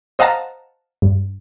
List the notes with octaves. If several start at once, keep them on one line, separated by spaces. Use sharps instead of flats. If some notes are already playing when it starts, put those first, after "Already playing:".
C5 D#5 F5 F#5 A5 A#5
G2